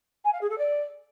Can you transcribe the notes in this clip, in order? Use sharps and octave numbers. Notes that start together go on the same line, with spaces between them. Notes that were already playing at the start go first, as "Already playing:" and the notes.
G#5
F5
G#4
A4
D5